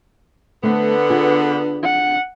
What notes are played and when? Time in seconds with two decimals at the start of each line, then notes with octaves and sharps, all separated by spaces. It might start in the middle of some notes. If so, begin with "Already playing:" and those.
0.63 D3 A3 B3 C4
1.10 D4 F4 G#4
1.83 F#5